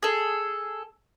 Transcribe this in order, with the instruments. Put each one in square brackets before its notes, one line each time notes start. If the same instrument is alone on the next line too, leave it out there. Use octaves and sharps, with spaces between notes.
[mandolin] G#4 A4